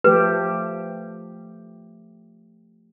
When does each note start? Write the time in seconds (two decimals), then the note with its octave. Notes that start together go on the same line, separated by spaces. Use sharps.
0.04 F3 A3 G4 B4